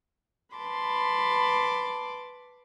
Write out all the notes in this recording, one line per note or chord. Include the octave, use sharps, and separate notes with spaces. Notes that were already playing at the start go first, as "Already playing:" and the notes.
B4 A5 B5 C6 D6